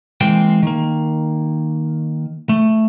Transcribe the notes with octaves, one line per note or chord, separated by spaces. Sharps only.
E3 G#3 A#3 C4 C5 G5
D#3 A#3
A3